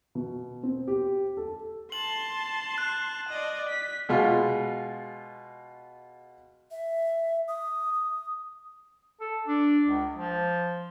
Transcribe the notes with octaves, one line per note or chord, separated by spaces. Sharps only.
B2
C4
G4
A4
A5 C6 F#7
F#6
D5 D#5
B6
B2 G#3 F4
E5
D#6
D#6
A4
D4
C#2
F3